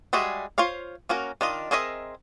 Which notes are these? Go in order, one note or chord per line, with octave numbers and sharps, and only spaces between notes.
G3 G#3 F#4 G#4 E5
F4 C5 C#5 F5
A#3 C#4 F#4 A#4
D#3 D4 F4 D#5
C4 G#4 A#4 D#5 E5